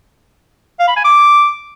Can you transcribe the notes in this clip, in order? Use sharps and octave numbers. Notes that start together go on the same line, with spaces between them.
F5
B5
G#5
D6